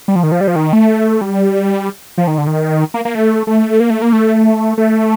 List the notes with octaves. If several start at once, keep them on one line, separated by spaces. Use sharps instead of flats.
G3
F3
D#3
F3
G3
F3
D#3
A3
G3
F3
D#3
D3
D#3
A#3
A#3
A3
A3
A#3
A3
A#3
A3
A3